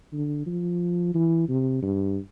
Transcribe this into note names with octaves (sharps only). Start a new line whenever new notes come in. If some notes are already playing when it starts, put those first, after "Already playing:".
D3
F3
E3
C3
G2